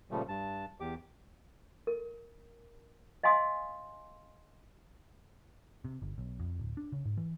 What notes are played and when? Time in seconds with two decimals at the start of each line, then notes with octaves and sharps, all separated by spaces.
0.11 A#2 C#3 F3 G3 A3
0.28 G2 A5
0.80 E2 G4 D6
1.87 A#4
3.23 D#5 F5 G#5 C6 D#6
5.85 C3
6.02 G1
6.18 B1
6.40 F2
6.59 D1
6.77 D4
6.92 C#3
7.05 G#2
7.17 E3